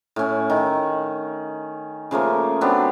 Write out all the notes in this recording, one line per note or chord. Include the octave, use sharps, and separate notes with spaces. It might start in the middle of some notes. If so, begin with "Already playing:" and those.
A2 C#4
D#3
C#3 F3 A3 A#3
F#3 B3 C4 D4